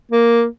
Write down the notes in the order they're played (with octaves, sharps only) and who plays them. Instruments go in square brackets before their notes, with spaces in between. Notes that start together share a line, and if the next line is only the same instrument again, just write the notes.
[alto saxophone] A#3